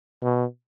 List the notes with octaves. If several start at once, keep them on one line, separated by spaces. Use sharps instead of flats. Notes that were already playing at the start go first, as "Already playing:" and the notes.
B2